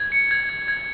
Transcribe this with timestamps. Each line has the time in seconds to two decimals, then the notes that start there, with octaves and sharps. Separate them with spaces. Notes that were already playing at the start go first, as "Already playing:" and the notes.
Already playing: G#6
0.12 C#7
0.31 G#6
0.49 G#6
0.68 G#6